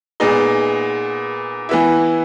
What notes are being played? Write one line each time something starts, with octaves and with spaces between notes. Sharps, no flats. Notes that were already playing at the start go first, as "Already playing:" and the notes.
A#2 G#3 B3 D#4
E3 B3 E4